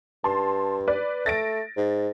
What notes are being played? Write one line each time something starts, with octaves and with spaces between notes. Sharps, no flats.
G2 A5 C6
B4 D5
A3 A6 A#6 D7
G#2